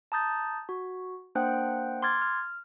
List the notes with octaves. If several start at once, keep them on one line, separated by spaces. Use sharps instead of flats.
A5 A#5 D#6 G6 A6
F#4
A#3 D4 C5 F#5 G5 F#6
C6 D6 F6 G#6 A6
F6